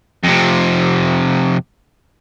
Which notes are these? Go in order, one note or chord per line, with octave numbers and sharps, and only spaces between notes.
F2 C3